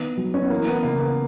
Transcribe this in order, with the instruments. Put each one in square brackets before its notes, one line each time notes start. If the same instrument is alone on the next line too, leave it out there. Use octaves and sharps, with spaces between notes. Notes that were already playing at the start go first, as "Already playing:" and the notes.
Already playing: [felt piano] D#3 B3
F#3
[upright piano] C#4
B3
[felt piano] E3 [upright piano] A#3
[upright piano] B3
[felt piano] C#3 [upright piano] A#3
[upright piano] B3